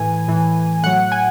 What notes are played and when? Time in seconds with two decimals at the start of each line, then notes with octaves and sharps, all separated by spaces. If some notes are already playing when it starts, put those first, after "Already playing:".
Already playing: A2 E3 G#5
0.28 A2 E3
0.83 A2 F#3 F#5
1.12 G#5